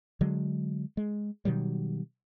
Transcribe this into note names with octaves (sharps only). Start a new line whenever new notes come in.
D3 F#3 G#3
G#3
B2 D#3 F#3 G3